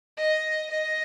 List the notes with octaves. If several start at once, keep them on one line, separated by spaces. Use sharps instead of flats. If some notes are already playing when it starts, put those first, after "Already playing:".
D#5
D#5